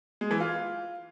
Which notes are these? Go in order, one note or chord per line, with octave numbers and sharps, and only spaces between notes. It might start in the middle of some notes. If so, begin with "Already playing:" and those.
G#3
E3
F4